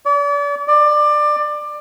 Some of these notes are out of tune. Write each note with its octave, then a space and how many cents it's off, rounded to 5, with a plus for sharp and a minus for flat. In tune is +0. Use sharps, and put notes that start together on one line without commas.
D5 -40
D5 +20